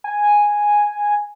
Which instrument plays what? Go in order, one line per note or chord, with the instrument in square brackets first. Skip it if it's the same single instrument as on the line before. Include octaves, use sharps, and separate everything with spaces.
[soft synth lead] G#5